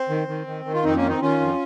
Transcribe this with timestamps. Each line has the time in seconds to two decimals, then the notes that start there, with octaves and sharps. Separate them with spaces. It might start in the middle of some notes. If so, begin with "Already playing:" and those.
Already playing: C4
0.09 D#3
0.28 D#3
0.47 D#3
0.65 D#3
0.74 F4
0.84 F2 C4 D#4
0.96 A#3 C#4
1.02 D#3
1.09 C4 D#4
1.21 D#3 C#4 F4
1.40 F2